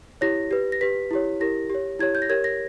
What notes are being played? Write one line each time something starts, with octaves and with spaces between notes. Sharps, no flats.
E4 G4 C#5 A#6
G4 B4
A#6
G4 B4 B6
E4 G4 C#5
E4 G4 A#4 A#6
G4 C#5
E4 G4 C#5 G#6
G6
A#6
G4 A#4 C#5 G#6
A#6